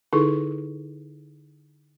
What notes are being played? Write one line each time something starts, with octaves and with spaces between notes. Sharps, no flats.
D3 D#4 E4 G#4 A4 C#6